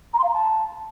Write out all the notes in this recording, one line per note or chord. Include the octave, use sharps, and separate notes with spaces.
A#5
C6
F5
A#5
A5